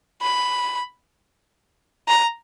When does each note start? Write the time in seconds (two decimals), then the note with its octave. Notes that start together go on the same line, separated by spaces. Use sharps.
0.22 B5
2.08 A#5